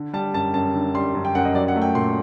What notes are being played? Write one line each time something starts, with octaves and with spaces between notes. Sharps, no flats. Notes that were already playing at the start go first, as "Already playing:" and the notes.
Already playing: D3
G3 A5
F#2 A5
F#2 A5
D3
G3 C6
F#2
G5
F#2 F#5
D#5
F#3 D5
F#5
A3
G5
A#2 C6